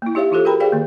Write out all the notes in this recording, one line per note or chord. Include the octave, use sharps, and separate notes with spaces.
A#3 E4
D#4 G4 C#5 E5 F5
E3 D#4 F4 G4 A4 C5
F#4 G#4 A#4 G5 A#5 B5
G4 G#4 C5 D5 F5 G5
D#3 A#3